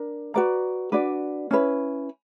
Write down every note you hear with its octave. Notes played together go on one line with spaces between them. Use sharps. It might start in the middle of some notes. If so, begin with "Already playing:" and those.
Already playing: D4 A#4
F#4 B4 D5 A#5
D4 F#4 B4 D5
C#4 E4 B4